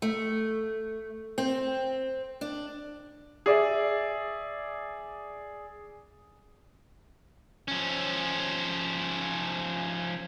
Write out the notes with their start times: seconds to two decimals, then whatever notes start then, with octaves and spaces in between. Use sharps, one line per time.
0.02 A3
1.38 C4
2.41 D4
3.46 G#4 D5 E5
7.68 F3 C#4